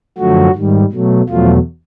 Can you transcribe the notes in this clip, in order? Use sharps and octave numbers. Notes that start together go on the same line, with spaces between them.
F#2 D3 F3 F#3 A3 F#4
G#2 D#3 G3
B2 F#3 A3
E2 B2 F3 F#3 A3 F4